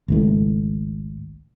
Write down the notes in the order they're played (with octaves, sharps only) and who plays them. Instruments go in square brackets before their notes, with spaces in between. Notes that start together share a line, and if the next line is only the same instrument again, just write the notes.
[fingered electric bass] G#1 C#2 A2